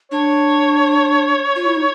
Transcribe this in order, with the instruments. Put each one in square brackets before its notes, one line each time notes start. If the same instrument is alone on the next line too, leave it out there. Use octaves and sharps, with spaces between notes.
[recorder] D4 [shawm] C#5
[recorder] F4
E4
D#4